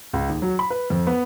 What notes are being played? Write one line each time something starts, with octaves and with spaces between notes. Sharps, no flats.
C#2
D#2
F#3
B5
B4
F2
B3